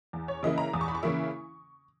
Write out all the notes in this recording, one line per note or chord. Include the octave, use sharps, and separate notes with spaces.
E2
C#5
C#3 E3 A#3 E4 D#5
A#5
E2 D#6
C#6
B5
C#6
C#3 E3 A#3 E4